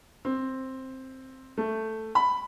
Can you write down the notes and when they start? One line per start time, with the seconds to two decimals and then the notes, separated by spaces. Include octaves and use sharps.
0.25 C4
1.58 A3
2.15 B5